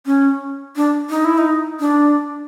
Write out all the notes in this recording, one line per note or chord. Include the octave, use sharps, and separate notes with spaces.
C#4
D4
D#4
E4
D#4
D4